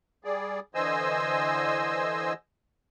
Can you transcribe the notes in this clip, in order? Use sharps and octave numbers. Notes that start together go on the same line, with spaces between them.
G3 G#4 D5
D3 E3 C5 D#5 G#5 E6